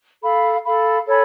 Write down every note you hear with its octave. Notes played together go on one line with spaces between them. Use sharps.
A4 F5 B5
A4 F5 B5
A4 C#5 G#5 B5